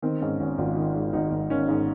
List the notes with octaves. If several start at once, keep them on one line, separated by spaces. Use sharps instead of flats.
D#3 C4
G#2 C#4
G#1 C#4
G#1 F4
D#3 F4
G#2
G#1 D#4
G#1
D#3 C#4
G#2